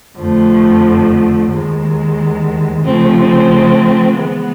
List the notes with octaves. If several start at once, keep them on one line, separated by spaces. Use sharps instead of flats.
F2 D3 F3 A3
D#2 D#3 G#3
C#3 F3 A3 C4
E3 G#3 B3